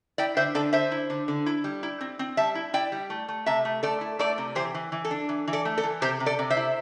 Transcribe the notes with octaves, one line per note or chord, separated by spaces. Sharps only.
E4 D5 G5
D3 C5 E5
D3 A4 D5
D3 C5 E5
E4
D3
D3
E4
G3
E4
C4
C4
G3 E5 A5
E4
E4 D5 G5
G3
A3
A3
C3 E5 A5
A3
A3 A4 D5
E4
A3 A4 D5
C3
E3 G4 C5
E3
E3
A4
D4
E3
E3
A4 D5
A3
A4
E3
C3 G4 C5
C3
A4 D5
C3
C5 E5
E4